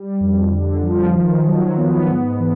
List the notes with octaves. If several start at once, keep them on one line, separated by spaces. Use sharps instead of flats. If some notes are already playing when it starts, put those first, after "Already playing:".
Already playing: G3
F2
D3
F3
D#3
F#3
B3
G#2
E3